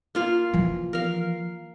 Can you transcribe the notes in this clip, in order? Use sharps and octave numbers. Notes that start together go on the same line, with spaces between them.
A#3 F4 F5
E3 F3
A#4 F5